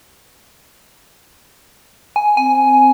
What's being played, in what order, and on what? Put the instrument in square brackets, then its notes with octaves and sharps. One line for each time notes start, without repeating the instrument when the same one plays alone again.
[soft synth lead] G#5
[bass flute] C4 [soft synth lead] G#5